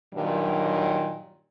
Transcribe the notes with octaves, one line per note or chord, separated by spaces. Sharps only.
G2 A#2 D#3 F#3